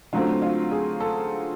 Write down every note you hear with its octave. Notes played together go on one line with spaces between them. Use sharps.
D3 F#3 A3 C4 F4
F4
G#4
A4